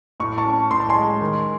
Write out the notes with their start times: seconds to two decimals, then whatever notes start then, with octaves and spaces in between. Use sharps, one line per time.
0.20 A2 C#6
0.38 A5 C#6
0.45 C#4
0.71 A2 C6
0.80 A5
0.89 G#5 C6
0.96 G#3
1.21 D#3